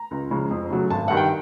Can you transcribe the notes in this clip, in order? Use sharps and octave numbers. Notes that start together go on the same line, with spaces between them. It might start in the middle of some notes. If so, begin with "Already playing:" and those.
Already playing: A#5
C#2
C#3 F3 G#3
F2
C#3 F#3 A3
G#1 A5
G2 D#3 F#5
G5